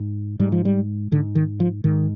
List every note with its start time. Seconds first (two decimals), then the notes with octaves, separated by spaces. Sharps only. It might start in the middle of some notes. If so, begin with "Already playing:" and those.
Already playing: G#2
0.39 G#2 G3
0.52 F3
0.65 G3
1.12 G#2 D3
1.35 D#3
1.60 F3
1.84 G#2 D#3